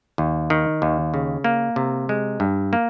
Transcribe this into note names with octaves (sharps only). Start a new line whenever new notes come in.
D#2
D#3
D#2
C#3
A#3
C3
G#3
G2
A#3